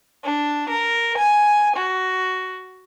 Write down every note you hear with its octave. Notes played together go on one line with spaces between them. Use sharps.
D4
A#4
G#5
F#4